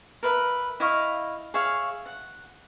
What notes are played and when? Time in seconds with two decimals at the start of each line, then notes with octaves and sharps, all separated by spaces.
0.23 A#4 B4 E5
0.80 E4 D#5 F5 C#6
1.54 G#4 C#5 E5 F5
2.06 F#5